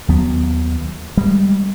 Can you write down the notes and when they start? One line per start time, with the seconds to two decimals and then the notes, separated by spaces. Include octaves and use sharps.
0.08 D#2 F#3 B3
1.17 G3 G#3